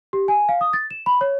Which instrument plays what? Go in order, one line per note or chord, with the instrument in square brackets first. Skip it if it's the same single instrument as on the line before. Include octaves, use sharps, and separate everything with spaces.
[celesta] G4
G#5
F5
D#6
A6
E7
B5
C#5